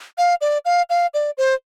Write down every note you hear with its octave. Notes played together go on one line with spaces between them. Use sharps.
F5
D5
F5
F5
D5
C5